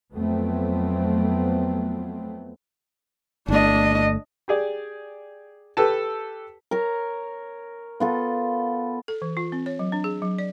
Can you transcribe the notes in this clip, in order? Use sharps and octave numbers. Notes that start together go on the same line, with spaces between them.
F2 F#3 A3 B3 C4
G1 A3 D4 D#5
G4 G#4 D5
G4 A4 B4 A5
A#4 C#5 A#5
B3 F4 A4
A4
E3
F4
C4
C#5
F#3
D4
G#4
F#3
D5